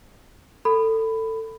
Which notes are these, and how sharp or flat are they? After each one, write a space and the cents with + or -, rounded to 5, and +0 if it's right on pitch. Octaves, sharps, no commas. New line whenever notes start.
A4 +25 B5 +15